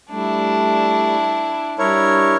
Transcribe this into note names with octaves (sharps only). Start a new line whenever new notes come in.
G3 A3 D4 E4
G3 D4 E4 A#4 C#5